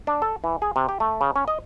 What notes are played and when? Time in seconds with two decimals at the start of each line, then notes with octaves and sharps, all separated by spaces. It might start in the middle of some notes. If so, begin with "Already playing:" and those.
0.07 D4
0.22 A4
0.44 E3
0.62 G#4
0.76 C3
0.89 G4
1.00 A3
1.21 C#3
1.36 C#4
1.48 D#5